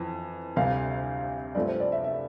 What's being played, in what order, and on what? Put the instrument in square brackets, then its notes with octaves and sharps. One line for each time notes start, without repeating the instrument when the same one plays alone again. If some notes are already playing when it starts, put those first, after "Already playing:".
Already playing: [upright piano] F2 E3
D2 C3 G3 F5
G2 F3 A3 C4 D5
C5
D5
E5
E5